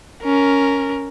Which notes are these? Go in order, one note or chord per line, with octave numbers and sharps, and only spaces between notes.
C#4 A#4